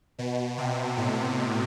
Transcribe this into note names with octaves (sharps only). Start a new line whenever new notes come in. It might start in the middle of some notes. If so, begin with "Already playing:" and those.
B2
C3
A2